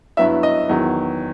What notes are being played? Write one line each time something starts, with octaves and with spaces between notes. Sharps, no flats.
G2 F#3 B3 E4 E5
D#5
E2 D#3 F#3